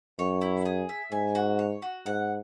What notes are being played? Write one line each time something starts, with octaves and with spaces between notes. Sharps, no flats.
F#2 C#5
E4
G#4
E5
G#2 G#5
F#4
C#5
F#4
G#2 F#5